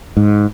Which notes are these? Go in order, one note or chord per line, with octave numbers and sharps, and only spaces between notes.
G#2